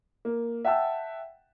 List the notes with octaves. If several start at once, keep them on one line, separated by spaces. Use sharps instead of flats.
A#3
E5 F#5 G5 A5 E6